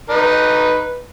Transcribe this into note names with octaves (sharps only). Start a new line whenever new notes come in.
D#4 B4